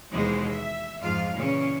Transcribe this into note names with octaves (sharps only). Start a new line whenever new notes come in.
D#2 B2 E3 G#3 C5
E5
F2 G#2 F4 F5
A#2 C#3 E3 C#4